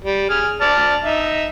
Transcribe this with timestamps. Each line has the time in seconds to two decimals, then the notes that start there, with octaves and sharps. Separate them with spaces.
0.04 G3
0.30 G#4 F6
0.61 D5 A5 F6
1.04 D#4 E5